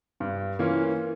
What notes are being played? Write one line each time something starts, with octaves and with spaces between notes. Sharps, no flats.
G2
E3 A#3 C#4 F4